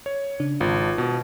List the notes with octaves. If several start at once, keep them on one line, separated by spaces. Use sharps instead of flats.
C#5
C#3 D4
G#1 F4
B2